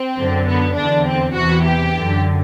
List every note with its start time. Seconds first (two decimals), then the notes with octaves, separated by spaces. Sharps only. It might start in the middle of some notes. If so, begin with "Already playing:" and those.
Already playing: C4
0.17 F#2 D3
0.46 B3
0.76 E2 D3 D4
1.06 C4
1.35 E2 C3 E3 F#4
1.64 G4
1.94 F#2 D3